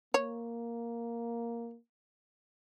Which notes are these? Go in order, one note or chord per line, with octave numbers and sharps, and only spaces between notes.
A#3 C#5